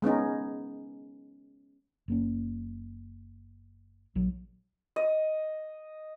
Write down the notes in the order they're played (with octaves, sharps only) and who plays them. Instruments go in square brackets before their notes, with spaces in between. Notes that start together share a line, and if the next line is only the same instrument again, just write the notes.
[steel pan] G#3 B3 C#4 D#4
[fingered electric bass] F#1 A#3 C#4
A#1 F#3
[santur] D#5